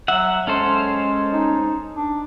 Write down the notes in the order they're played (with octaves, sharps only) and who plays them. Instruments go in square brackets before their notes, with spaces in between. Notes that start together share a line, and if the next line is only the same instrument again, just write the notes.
[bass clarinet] F#3 [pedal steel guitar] E5 F#5
[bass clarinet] G#3 [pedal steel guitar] C#4 A4 C5
[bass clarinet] D#4
D4